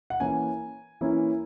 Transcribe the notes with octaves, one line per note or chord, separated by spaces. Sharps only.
F#5
E3 A#3 C#4 E4 G#5
E3 A#3 C#4 E4